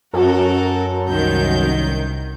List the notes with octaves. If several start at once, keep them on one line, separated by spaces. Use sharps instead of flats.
F#2 F#4 A4 A#4
C2 D#3 G6